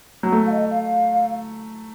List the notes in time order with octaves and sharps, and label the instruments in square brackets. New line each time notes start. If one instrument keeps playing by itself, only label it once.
[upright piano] F#3
A3
[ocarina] F5
D#5
F5